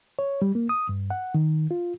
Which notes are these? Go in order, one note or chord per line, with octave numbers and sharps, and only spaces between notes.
C#5
G3
A#3
D#6
G2
F#5
D#3
F4